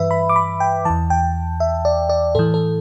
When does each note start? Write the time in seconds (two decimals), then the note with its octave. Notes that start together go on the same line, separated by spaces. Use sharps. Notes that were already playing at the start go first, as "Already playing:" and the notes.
Already playing: G2 E3 B4 E5
0.11 B5
0.29 D6
0.36 B5
0.60 G5
0.85 E2 E3 A5
1.10 G5
1.60 E5
1.85 D5
2.09 D5
2.35 A2 E3 A4
2.54 A4